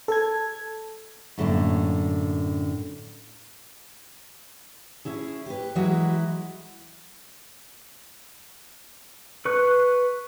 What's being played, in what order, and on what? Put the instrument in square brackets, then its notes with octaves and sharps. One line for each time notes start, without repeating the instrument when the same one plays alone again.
[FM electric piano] A4 G#6
[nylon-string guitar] F#2 A2 D3 G#3 A#3
[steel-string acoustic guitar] C#4 E4 G#4
G4 B4
E3 F#3 G#3 E4 F#4
[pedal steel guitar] B4 C#6 F#6